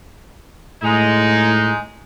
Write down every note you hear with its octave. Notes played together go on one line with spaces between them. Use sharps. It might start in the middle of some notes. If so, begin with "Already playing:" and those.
A2 G#3 D#4